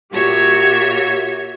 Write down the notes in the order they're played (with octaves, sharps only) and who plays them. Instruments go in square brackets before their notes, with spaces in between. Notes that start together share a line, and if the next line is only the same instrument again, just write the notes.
[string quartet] A#2 F#4 G4 C#5 E5